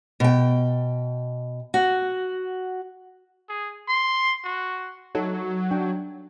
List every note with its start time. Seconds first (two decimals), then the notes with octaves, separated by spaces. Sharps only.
0.20 B2 G5
1.74 F#4
3.49 G#4
3.88 C6
4.44 F#4
5.15 F#3 D#4 A4
5.71 D4 G5